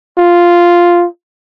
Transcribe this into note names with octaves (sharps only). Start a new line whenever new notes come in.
F4